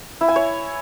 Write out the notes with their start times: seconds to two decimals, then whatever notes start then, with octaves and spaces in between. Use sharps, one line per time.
0.21 E4
0.28 G#5
0.36 C#5